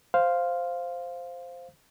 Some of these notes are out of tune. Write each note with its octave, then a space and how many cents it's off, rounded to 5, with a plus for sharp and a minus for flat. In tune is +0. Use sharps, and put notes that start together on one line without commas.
C5 +0 F5 +0